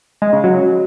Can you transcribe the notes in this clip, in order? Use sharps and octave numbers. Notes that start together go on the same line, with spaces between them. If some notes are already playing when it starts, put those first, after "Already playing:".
G#3
C#3
F#3